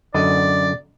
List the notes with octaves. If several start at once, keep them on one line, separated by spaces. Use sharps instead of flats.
F#2 D3 D5 D#5